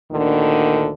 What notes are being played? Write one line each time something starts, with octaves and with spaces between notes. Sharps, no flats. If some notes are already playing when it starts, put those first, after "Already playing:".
D2 A#2 D3 D#3